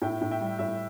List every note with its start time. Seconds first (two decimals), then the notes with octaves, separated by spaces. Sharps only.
0.02 A2 E5 G5
0.22 A2
0.31 E5 G5
0.41 G3
0.59 A2 E5